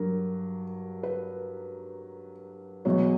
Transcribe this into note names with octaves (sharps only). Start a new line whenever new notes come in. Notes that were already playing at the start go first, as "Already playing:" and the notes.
Already playing: G2 F#3 A#4
B4
E2 B2 F#3 C#5